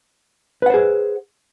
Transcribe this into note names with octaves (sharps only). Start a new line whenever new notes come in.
G#4 B4 C5 F#5